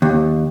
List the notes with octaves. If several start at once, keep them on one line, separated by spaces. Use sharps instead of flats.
D#2